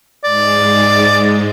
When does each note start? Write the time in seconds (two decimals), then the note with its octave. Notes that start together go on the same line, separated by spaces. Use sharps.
0.24 G#2 G#3 D5